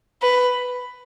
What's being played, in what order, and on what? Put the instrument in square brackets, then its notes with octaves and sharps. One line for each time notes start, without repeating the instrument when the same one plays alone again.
[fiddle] B4